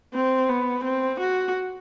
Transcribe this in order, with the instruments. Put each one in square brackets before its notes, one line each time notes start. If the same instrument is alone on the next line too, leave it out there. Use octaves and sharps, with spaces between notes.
[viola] C4
B3
C4
F#4